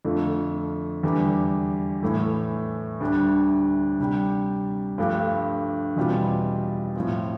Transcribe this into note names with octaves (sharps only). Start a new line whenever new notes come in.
F2 D3 F3 A3
E2 D3 G3
A2 E3 A3 E4
D2 D3 G3 D4
C3 G3 D4 G4
G2 F3 A3 D4 G4
E2 B2 G3 C4 F4
A2 F3 C4